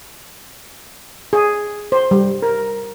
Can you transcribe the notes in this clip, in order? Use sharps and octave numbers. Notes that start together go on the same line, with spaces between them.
G#4
C5
G3
A#4